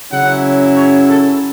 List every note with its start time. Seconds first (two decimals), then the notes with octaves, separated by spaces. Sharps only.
0.11 C#3 F#3 C#4 E4 F#5
0.76 C#5
1.08 A4